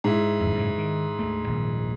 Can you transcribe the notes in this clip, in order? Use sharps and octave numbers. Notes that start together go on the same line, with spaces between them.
G#2 E4
G#1 F2
F#2 A2 C#3
D#3
D2 A3
D#1 A#1 D#3